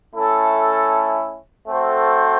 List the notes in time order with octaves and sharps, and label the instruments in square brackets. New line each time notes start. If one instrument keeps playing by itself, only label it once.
[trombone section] A3 C#4 E4 A4
A3 C4 F#4 A4 C5